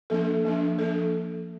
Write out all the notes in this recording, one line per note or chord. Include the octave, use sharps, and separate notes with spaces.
F3 A#3 D4 A4
F3 A#3 D4
F3 A#3 D4 A4